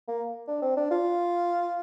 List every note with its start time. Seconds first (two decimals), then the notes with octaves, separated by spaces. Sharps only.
0.08 A#3
0.47 D4
0.62 C4
0.77 D4
0.91 F4